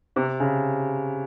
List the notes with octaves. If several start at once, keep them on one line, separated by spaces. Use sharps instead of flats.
C3
C#3